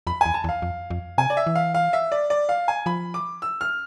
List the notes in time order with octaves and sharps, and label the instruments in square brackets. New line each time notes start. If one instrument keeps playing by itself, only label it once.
[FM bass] F2 [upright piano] B5
[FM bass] E2 [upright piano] G#5
[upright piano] A5
[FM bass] E2
[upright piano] F5
[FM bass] F2
F2
[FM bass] C3 [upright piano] G#5
[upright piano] D5
E5
[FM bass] E3
[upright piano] F5
F5
E5
D5
D5
F5
G#5
[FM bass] F3 [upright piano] B5
[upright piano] D6
E6
F6